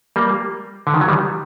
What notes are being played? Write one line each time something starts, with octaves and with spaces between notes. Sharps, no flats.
G3 A#3
D3
D#3
F#3
D#3 G3